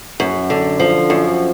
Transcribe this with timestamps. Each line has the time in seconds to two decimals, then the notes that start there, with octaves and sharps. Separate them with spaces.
0.20 F#2
0.50 D3
0.80 F3
1.10 F#2